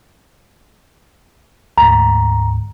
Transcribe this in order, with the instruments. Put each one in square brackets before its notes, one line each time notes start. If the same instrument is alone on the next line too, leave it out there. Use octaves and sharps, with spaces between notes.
[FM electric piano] D2 G#2 [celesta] A#5